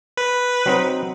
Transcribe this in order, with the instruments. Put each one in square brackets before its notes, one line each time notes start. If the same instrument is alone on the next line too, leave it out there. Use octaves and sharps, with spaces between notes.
[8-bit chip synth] B4
[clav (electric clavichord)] F#3 C4 D#4